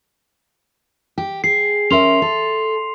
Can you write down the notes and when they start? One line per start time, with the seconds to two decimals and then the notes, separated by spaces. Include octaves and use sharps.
1.18 G4
1.44 G#4 C7
1.90 C#4 A#4 E5 C6 F7
2.22 A4